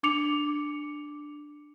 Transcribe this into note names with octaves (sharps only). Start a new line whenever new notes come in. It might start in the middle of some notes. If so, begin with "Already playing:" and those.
D4 D6 C#7 F7